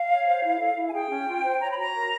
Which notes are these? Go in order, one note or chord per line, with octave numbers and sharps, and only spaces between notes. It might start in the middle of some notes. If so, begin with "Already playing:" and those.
Already playing: F5
C#5
C5
E4
A4
E4
G#5
G#4 G5
C#4
F4
C5
C#5 A#5
B5
F#4 A#5
A#4